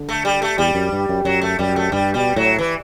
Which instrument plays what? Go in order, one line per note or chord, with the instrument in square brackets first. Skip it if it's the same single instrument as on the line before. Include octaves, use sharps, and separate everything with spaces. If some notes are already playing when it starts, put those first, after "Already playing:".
Already playing: [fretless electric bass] D3
[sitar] A3
G3
A3
[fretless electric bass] E2 [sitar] G3
[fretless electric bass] F#2
G2
F#2
[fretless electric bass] F#2 [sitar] F#3
[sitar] A3
[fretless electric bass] F#2 [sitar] G3
[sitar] A3
[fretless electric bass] G2 [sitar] G3
[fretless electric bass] B2 [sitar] G3
[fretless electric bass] A2 [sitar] F#3
[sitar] E3